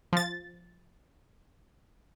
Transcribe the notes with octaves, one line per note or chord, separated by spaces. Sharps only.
F3 A6